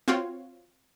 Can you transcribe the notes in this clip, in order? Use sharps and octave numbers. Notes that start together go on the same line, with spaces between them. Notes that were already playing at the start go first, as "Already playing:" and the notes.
C4 F4 F#4 C#5